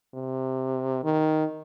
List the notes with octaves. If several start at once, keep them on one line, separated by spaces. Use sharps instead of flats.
C3
D#3